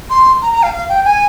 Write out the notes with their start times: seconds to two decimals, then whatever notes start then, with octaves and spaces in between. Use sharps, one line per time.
0.10 C6
0.42 A#5
0.52 A#5
0.63 F5
0.73 F5
0.89 G5
1.05 G#5